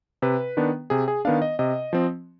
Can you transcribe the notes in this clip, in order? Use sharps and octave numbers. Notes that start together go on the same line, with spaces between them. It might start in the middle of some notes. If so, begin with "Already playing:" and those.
C3 B4
D#3 B3 D4
C3 G#4
G#4
D#3 B3 D4 F5
D#5
C3 D#5
F3 C4